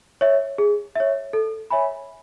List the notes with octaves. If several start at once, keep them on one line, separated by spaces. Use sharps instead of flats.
C#5 E5
G#4
C#5 E5
A4
C#5 E5 G#5 B5